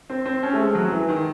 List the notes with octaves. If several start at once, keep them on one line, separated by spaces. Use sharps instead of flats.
C4
C4
C#4
A3
G#3
F#3
E3
D#3